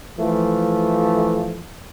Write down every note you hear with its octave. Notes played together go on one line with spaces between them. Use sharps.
E3 F3 A3